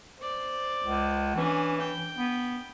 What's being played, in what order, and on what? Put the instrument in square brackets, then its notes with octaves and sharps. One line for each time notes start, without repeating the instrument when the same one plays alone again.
[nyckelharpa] C5 D5
[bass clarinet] C#2
[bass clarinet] E3 [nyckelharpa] C#4 D4
[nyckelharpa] G5
[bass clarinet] B3